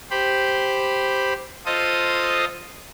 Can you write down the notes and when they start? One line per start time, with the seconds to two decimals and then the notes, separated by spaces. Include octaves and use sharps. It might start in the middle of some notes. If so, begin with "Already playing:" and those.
0.11 G4 C5 B5
1.66 F4 A4 C5 D#5 D#6